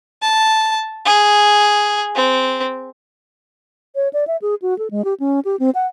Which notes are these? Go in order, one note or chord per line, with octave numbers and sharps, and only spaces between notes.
A5
G#4
C4
C#5
D5
E5
G#4
F#4
A4
G#3
G4
C#4
G4
C4
F#5